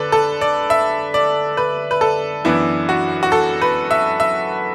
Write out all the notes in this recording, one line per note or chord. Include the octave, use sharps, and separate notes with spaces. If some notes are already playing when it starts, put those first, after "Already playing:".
Already playing: D3 A4 B4 D5
A4
D5
E5
D5
B4
B4
A4
F#2 E3 B3 D4 E4
F#4
F#4
A4
B4
E5
E5